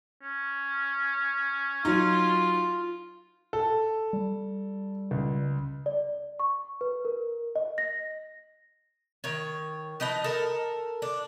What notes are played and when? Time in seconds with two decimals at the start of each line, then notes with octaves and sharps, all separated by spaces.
0.23 C#4
1.85 F#3 D#4 F4
3.53 A4
4.13 G3
5.11 C#2
5.86 D5
6.40 C#6
6.81 B4
7.05 A#4
7.56 D#5
7.78 A#6
9.24 D#3 C#5
10.00 F3 D#4 B4 D#5
10.24 A4 A#4
11.02 D4